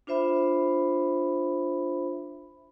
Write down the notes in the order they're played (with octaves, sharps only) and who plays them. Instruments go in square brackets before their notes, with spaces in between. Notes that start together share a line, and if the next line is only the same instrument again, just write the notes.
[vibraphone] D4 F4 C5 E5 B5